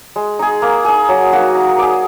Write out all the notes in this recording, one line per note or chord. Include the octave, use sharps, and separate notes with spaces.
G#3
D#4 G#4
A#3
D#4 G#4
F#3
A#3 D#4 F#4
D#4
G#4 D5